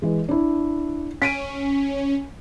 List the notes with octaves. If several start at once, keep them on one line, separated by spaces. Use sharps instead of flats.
E3 G#3
D4 E4
C#4 B6 D7 D#7